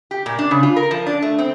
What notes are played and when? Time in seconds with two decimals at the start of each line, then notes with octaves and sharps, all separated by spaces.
0.11 G4
0.26 A#2
0.39 D4
0.51 C#3
0.63 F4
0.76 A#4
0.91 F3
1.07 D4
1.22 A3
1.39 C4